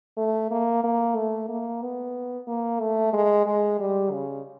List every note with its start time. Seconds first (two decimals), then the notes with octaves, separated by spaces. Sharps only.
0.17 A3
0.51 A#3
0.84 A#3
1.16 A3
1.49 A#3
1.82 B3
2.47 A#3
2.80 A3
3.13 G#3
3.46 G#3
3.79 G3
4.12 C#3